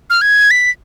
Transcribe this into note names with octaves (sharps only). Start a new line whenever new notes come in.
F6
G#6
B6